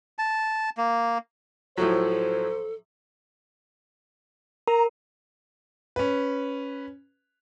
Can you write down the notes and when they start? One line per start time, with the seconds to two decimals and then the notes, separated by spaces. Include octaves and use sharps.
0.18 A5
0.77 A#3
1.77 A2 F3 F#3 A4 C5
4.67 A#4 A#5
5.96 C#4 B4